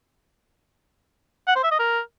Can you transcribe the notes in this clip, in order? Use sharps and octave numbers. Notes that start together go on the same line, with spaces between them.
F#5
C5
E5
D#5
A#4